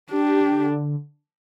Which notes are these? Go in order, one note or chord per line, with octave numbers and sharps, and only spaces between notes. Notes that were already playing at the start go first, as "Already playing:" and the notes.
D4 G4
D3